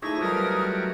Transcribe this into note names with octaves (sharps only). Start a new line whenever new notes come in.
F3 A3 D#4 E4 G#4 D5 C#6
D#3 F#3 G3 A#4 B4 F5 D#6 F6